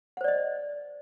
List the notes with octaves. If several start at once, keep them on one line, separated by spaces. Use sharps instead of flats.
C5 D5 D#5 F#5